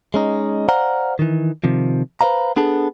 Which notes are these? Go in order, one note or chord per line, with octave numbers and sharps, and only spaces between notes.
G#3 C#4 D#4
C5 D5 F5 F#5 A#5
D#3 E3
C3 D#3 F3
B4 C5 D5 F5 A#5
B3 D4 G#4 A4